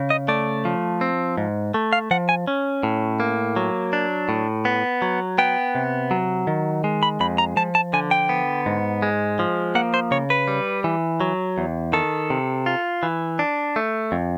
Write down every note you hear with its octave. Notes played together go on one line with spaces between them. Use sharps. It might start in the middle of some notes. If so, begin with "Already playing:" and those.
Already playing: C#3
D#5
A3 D5
F3
C4
G#2
A3
F5
F3 F#5
G#5
C#4
A2
A#3
F#3
D4
A2
B3
F#3
B3 G5
C3
F#3
D#3
G#3
B5
F2 B5
A#5
F3 A5
A5
D3 G#5
G5
B3
G#2
G#3
F3
A#3 F#5
C5
C#3 C#5
B4
G3
E3
F#3
E2
D#3 A4
C3
F4
E3
D4
A3
F2